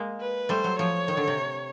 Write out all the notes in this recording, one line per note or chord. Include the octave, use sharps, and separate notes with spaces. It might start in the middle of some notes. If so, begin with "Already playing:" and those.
Already playing: G#3 A#3
B4
G3 A3 C5
F#3
F3 C#5
D#3
D3
C3